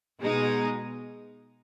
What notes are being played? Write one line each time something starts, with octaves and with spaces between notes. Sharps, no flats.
B2 G#3 D#4